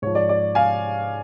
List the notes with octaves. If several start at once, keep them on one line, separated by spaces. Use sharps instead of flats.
G#2 F3 C#5
D5
D5
F5 G#5